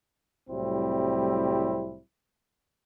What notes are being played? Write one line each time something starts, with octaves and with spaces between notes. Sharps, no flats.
C2 A2 F#3 G3 C4 E4